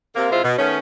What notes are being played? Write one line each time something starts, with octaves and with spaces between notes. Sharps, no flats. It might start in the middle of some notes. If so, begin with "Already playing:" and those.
C3 A#3
C3 G#3 E4 F4 C5
B2
D#3 A3 B3 C#4